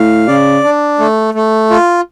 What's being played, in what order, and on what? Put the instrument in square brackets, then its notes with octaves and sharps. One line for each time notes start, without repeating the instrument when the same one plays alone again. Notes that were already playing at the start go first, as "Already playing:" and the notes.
Already playing: [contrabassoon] A2 [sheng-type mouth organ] F5
[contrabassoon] C#3 [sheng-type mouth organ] D5
[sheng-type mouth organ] D4
A3
A3
F4